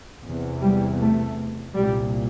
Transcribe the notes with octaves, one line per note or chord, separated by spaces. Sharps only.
E2 C3
G3
A3
C2 A#2 G3